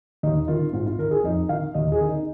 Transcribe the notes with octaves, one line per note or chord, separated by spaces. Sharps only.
D#2 D#4
D#3 F4
G#2 F4
F4
D#3 A#4
G#4
F2 D#4
D#3 F5
D#2 D#5
G#4
D#3
D#4